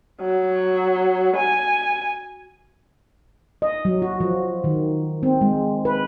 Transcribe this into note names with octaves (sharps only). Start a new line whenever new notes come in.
F#3
G#5
D#5
F#3
F#4
F3
D#3
C4
G#3
B4